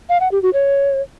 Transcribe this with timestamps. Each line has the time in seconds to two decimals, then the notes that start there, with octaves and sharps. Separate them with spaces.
0.09 F5
0.20 F#5
0.31 G4
0.42 F#4
0.53 C#5